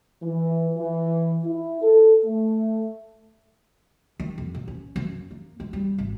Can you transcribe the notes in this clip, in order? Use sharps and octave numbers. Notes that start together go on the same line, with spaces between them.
E3
E3
E4
A4
A3
D#3
F2
A#2
C#4
F#2
A#3
G#3
G3
G#1